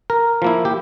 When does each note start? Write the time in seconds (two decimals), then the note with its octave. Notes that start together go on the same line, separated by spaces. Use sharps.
0.10 A#4
0.42 F3 A#3 E4
0.65 G4